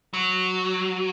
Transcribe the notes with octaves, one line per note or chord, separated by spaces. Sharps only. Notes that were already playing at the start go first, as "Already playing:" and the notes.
F#3